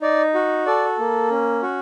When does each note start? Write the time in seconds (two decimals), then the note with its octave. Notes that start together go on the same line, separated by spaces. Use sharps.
0.01 D#4 D5
0.35 F#4
0.66 A4 D5
0.99 A#3
1.30 C#4
1.63 F#4